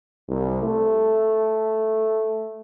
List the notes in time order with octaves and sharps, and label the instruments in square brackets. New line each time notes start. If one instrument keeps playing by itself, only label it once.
[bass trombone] C2
A3